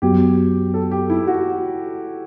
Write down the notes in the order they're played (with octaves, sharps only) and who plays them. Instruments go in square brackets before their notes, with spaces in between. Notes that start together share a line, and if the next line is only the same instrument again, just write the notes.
[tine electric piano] F#2 F#3 B3 F#4 [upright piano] G4
[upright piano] A4
G4
E4
F#4